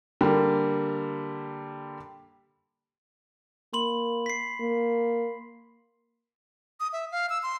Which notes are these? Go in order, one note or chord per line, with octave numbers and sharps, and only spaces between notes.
D3 G3 A#3
A#3 B5 C6 F#7
B6 C7
A#3
D#6
E5
F5
E6
C6